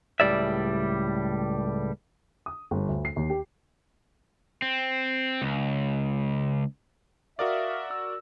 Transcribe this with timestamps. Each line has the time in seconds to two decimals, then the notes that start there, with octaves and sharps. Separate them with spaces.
0.20 C#2 A2 G3 D5 E5
2.46 D#6
2.71 G1
2.89 D2
3.05 C7
3.16 D#2
3.30 G4
4.62 C4
5.42 C#2
7.39 F#4 A#4 D5 E5 F5 D#6 F6
7.91 E6